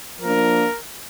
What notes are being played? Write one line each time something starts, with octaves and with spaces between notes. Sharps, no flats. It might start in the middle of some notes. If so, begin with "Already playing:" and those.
F3 A#3 D4 A#4